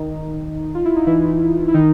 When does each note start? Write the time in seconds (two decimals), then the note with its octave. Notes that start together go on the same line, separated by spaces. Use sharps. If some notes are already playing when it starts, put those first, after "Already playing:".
Already playing: D#3 D#4
0.75 F4
0.85 E4
0.96 D#4
1.07 E3 E4
1.68 E4
1.74 D#3 D#4